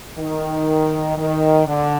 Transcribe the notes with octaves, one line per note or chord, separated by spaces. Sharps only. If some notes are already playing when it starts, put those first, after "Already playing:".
D#3
D#3
D3